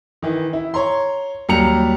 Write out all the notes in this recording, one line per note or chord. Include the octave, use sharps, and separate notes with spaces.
D#3 E3
E4
C#5 A#5 C6
D#2 F#3 G3 A#5 C#7 F7